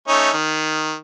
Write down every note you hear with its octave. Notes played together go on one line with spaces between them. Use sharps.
A3 C#4 D#4
D#3